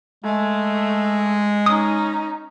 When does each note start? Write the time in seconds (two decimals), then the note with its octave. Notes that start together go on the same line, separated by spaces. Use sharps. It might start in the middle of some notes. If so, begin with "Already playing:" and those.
0.24 G#3 A3
1.66 C#4 D#4 D#6